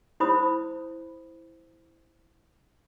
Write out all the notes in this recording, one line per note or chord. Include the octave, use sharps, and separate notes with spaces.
E4 C5 C#5 B5 D#6